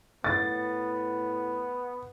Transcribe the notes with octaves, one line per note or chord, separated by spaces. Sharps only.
A2 B3 A6